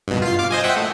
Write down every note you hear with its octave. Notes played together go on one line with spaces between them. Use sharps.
G2 B2
F4 C7
F5 D6
C5 D#5 G#5
E5 F#5 G5
A3